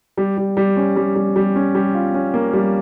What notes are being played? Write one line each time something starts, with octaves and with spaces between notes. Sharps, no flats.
G3
G3
G3
C#4
G3
G3
G3
C#4
G3
F4
C#4
A#3
G3